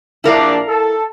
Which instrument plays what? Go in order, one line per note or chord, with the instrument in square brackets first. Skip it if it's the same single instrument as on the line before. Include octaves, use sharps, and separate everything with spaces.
[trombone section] A#1 D4 [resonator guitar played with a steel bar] E4 A#4 F5
[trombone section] A4